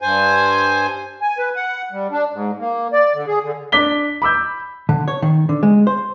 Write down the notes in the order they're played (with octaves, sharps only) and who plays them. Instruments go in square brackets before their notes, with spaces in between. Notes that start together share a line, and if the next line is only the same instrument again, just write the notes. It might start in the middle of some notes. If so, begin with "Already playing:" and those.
[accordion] G2 C5 G#5
G#5
B4
F#5
G3
D4
G#2
A#3
D5
D3
G#4
D3
[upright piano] D4 D5 D6 B6 G7
B5 D6 E6 G6
[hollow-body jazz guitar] D3
C#5
D#3
D3
G#3
C5